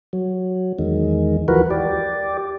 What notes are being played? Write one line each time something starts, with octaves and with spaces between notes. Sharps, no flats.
F#3
E2 D#3 G#3
D#2 E3 F3 F#4 A#4 B4
G4 D5